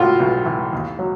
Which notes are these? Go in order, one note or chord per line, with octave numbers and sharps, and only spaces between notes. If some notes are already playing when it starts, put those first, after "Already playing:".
Already playing: A2 F4 F#4
B1
E3
D#2
F#3